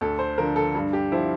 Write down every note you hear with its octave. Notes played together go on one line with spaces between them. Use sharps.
D2 A4
C5
D3 F3 A#4
A4
G2
G4
F3 E4